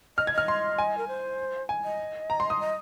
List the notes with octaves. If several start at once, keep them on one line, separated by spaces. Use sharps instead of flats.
D#5 F6
G#6
D#5 F6
C6
G#5
A#4
C5
G#5
D#5
A#5
C6
D#6
D#5